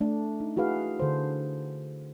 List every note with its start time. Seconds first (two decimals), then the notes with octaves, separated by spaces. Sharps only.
0.01 A3 D4
0.40 D#4
0.57 E4 F#4 G#4 B4 F5
1.00 D3 A4 C5